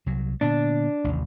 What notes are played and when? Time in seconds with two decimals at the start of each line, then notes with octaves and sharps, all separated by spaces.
0.06 C2 F#3
0.41 A#2 D3 B3 D4
1.04 A1 D#2 C3